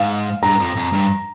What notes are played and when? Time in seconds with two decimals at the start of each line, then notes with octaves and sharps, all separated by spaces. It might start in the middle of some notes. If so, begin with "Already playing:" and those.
Already playing: G#2 F5
0.42 G2 A#5
0.59 F2
0.76 F2
0.93 G2